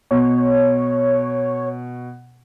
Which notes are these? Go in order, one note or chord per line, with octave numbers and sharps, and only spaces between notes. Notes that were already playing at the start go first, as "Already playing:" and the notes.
B2 C#5